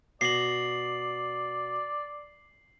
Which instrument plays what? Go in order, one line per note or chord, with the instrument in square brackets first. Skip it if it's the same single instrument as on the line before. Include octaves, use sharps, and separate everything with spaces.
[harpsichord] B2 [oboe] D5 [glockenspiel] C7 F#7